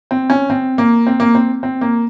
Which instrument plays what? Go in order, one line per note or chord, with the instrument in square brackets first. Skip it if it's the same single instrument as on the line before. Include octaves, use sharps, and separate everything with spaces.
[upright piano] C4
C#4
C4
A#3
C4
A#3
C4
C4
A#3